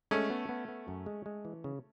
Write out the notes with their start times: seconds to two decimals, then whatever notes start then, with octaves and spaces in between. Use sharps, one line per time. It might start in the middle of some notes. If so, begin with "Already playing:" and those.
0.11 G#3 A3 C#4
0.30 B3
0.49 B3
0.68 B3
0.88 F#2
1.06 G#3
1.26 G#3
1.45 E3
1.64 C#3